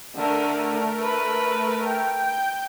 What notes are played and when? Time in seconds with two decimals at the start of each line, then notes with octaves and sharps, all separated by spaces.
0.16 D3 A3 A#4
1.01 B4
1.84 G5
2.28 G6